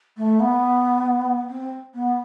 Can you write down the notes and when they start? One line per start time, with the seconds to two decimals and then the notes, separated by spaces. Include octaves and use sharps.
0.17 A3
0.40 B3
1.50 C4
1.94 B3